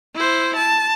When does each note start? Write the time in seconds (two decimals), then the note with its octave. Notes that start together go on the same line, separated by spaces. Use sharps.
0.16 E4 C5
0.57 A5